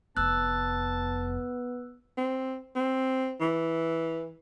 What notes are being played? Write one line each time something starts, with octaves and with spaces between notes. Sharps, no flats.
F1 F2 B3 A5 E6 F#6
C4
C4
E3